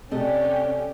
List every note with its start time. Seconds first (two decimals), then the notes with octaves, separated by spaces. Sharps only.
0.11 C3 A3 C#4 D4 G4 A4 D#5